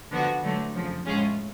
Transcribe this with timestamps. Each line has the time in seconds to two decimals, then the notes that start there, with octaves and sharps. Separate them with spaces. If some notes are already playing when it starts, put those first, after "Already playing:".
0.10 D3 F3 B3 F#4
0.42 D3 F#3 A3
0.74 F2 C#3 F3
1.05 A2 G#3 C#4 F4 G#4